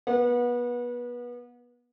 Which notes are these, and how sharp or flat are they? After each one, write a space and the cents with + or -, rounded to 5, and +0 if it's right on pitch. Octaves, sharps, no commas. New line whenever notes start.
B3 -25 F#5 -30